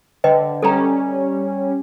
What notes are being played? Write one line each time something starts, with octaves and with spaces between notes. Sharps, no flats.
D3 B4 D#5 G5
G3 C#4 A4 A#5